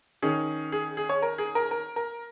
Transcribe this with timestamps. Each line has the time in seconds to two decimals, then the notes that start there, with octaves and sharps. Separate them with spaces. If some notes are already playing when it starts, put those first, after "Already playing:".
0.22 D#3 C#4 G#4
0.72 G#4
0.97 G#4
1.09 C#5
1.22 A#4
1.38 G#4
1.55 A#4
1.71 A#4
1.96 A#4